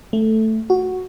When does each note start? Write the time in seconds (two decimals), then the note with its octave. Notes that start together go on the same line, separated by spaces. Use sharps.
0.13 A3
0.70 F#4